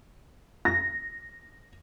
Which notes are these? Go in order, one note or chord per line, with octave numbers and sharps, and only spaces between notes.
A#6